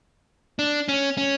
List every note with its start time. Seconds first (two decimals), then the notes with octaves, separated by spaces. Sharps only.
0.59 D4
0.88 C#4
1.17 C#4